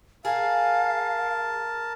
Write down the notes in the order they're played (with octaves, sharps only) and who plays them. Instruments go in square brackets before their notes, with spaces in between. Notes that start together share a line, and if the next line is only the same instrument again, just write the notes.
[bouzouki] G#4 [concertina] A#4 A5 [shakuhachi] F5